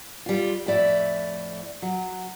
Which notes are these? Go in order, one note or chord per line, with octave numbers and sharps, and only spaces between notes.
G3 F4
F2 A2 D5 E5
F#3